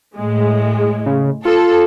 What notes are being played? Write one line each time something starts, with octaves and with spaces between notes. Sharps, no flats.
A2 G#3
C#3
F4 A4